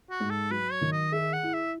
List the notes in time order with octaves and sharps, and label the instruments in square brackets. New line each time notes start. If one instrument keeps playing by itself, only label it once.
[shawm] F#4
[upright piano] G#2
[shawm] A4
[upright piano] F#3 [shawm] B4
[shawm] C#5
[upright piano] D#3
[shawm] D#5
[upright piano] G#4 [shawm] E5
[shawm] F#5
[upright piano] E4
[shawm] E5